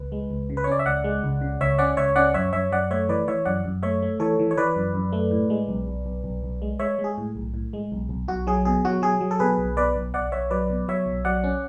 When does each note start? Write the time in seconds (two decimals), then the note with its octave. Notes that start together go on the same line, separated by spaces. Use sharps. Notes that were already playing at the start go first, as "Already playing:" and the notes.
Already playing: C#2 B4
0.12 G#3
0.30 C#2
0.50 C#3
0.57 B4
0.64 C#5
0.67 C#4 D5
0.79 E5
0.86 C#2 D5 F#5
1.04 G#3
1.24 C#2
1.41 C#3
1.61 C#2 C#5 E5
1.78 C#4 D5 F#5
1.97 C#2 C#5 E5
2.16 C#4 D5 F#5
2.34 F#2 C#5 E5
2.53 F#2 C#5 E5
2.71 F#2 D5 F#5
2.91 A3 C#5 E5
3.09 E3 B4 D5
3.27 E3 C#5 E5
3.45 F#2 D5 F#5
3.65 F#2
3.83 A3 C#5 E5
4.02 A3
4.20 E3 A4 C#5
4.39 E3
4.51 C#5
4.57 E3 B4 D5
4.76 F#2
4.94 F#2
5.12 A3
5.31 A2
5.50 G#3
5.68 B1
5.88 B1
6.06 B1
6.24 B1
6.43 B1
6.62 G#3
6.79 G#3 C#5 E5
6.99 G#3
7.04 G#4
7.18 A2
7.35 B1
7.54 A2
7.73 G#3
7.92 B1
8.09 B1
8.28 B1 F#4
8.47 F#3 G#4
8.65 B2 G#4
8.85 F#3 F#4
9.02 F#3 G#4
9.21 F#3
9.31 A4
9.39 B2 G#4 B4
9.58 B1
9.76 B2 B4 D5
9.96 B1
10.14 B1 D5 F#5
10.32 B1 C#5 E5
10.51 F#3 B4 D5
10.70 B2
10.88 F#3 C#5 E5
11.06 B1
11.25 F#3 D5 F#5
11.44 C#4